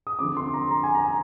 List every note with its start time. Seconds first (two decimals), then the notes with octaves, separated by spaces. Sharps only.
0.07 D#6
0.19 D3 F3 C4 D6
0.37 C6
0.54 A#5
0.71 A#5
0.84 G#5
0.95 A#5